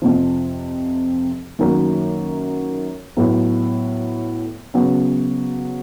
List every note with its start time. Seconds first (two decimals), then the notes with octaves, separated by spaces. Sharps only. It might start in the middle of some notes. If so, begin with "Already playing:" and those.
0.02 F2 C3 F3
1.59 F#2 D#3 F#3 A#3
3.17 A2 F#3 B3
4.74 C#3 F#3 B3